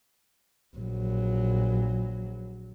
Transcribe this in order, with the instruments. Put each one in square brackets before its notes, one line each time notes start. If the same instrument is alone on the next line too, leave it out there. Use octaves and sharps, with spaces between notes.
[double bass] A#1 F#3